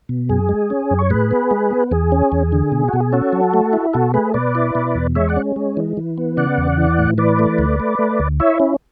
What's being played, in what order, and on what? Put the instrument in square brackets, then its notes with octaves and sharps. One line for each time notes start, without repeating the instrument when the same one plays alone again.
[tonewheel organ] B2
F#2 G#4
G#3
C#4
F#2
C#5
A2 G#4 B4
B3
G#3
B3
E2 G#4
C#4
E2
D3
B2
B2 F#4
G#4
C#4 F#4 A4
F#3
A3
E4
B2 F#4 A4
A3 G#4 B4
B2 B4 D5
E4
B2
E2
G#3 C#5 E5
D5 F#5
C#4
G#3
E3
E3
B3
C#3 D5 F#5
E2
E3
A2
E3 B4 D5
A3
D2
A3
A3
D2
E4 C#5 E5
C#4